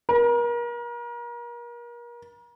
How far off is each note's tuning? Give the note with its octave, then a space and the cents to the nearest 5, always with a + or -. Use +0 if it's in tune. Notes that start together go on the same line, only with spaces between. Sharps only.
A#4 +35